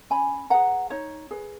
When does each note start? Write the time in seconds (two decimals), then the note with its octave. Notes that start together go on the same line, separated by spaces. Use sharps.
0.10 C#4 G#5 B5
0.50 G#4 B4 F#5 A#5
0.90 D#4 C#5
1.31 G#4 B4